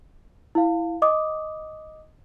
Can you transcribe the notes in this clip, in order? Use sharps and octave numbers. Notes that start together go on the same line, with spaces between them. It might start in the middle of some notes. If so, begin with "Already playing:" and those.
E4 F5
D#5 D6 D#6